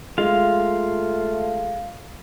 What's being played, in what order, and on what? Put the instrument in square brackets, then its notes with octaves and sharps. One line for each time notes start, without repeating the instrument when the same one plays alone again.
[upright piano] G#3 [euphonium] A3 [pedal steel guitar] F4 F5